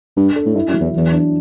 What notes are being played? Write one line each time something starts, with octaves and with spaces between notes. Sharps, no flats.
G2 D4
A4
A2
G2 E4
F#2
F#3
E2
E2 E3
D4